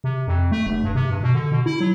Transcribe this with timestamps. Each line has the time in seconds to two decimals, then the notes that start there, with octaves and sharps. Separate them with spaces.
0.04 C3
0.27 F2
0.52 A3
0.66 F1
0.84 G2
0.95 C3
1.10 G2
1.23 B2
1.34 D3
1.52 B2
1.66 E4
1.80 F#3